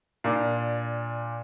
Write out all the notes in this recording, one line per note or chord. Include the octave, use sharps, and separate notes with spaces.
A#2 D4